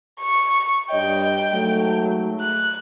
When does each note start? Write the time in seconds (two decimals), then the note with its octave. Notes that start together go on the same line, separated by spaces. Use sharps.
0.21 C#6
0.91 G2 C#5 D#5 G5
1.53 G#2 F#3 A3
2.41 F#6